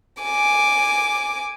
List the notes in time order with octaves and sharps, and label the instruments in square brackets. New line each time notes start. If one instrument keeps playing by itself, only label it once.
[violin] G#5 D6